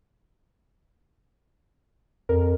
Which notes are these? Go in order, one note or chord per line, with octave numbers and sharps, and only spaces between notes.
F2 A#4